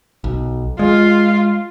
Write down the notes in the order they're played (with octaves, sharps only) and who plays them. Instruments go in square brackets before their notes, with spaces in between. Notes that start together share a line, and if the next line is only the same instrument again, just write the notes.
[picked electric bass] B1
[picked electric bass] G#3 [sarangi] F4